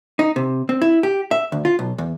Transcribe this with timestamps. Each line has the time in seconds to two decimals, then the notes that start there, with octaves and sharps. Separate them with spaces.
0.19 D#4
0.36 C3
0.69 C4
0.82 E4
1.03 G4
1.31 E5
1.52 D2
1.65 F4
1.79 B1
1.98 E2